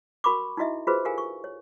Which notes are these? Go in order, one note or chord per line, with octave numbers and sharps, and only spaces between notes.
F#4 A#4 B5 C#6 D6
D#4 E4 F#4 D#5 E5
F4 F#4 G#4 B4 C5
G4 A#4 F5 G#5
C#6
C#5